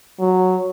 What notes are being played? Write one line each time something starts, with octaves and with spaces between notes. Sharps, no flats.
F#3